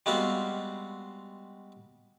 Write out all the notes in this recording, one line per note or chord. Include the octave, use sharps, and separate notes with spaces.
G3 G#3 B3 C4 F#4 F5